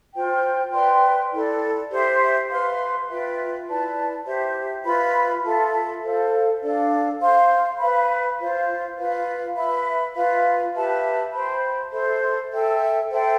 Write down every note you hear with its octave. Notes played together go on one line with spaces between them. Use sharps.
F4 C5 G5
B4 D5 G5 C6
E4 A4 D5
G4 C5 E5
B4 F5 C6
F4 B4 E5 G5
E4 B4 D5 A5
G4 C5 E5
F4 B4 E5 B5
F4 A4 E5 A5
A4 C5 F5
D4 A4 D5 F5
C5 F5 C6
B4 F5 B5
F4 C5 F5
F4 B4 F5
B4 E5 B5
F4 B4 F5
G4 B4 E5 A5
C5 G5 B5
A4 C5 E5
A4 E5 G5
A4 C5 E5 G5